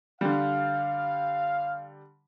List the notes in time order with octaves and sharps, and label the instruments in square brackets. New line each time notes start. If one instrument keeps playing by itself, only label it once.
[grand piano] D3 G3 [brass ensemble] F5